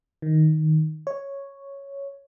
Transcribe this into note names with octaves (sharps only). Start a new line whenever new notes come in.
D#3
C#5